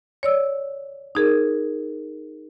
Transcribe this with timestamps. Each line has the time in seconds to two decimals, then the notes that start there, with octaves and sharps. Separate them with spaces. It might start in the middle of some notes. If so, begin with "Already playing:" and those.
0.23 C#5 D5 E6
1.15 D#4 G#4 A#4